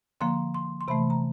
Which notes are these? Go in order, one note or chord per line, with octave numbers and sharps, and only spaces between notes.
D3 F3 A#3 C6
C6
C6
C3 E3 A3 B5
A#5